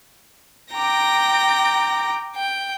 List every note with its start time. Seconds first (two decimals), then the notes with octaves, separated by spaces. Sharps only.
0.73 G5 A#5 D6 A#6
2.36 G5